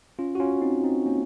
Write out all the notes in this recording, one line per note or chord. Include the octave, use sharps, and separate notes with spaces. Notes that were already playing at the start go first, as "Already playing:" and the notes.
C#4 F4
F#4
C#4 F4
C4 D#4
C4 D#4
A#3 C#4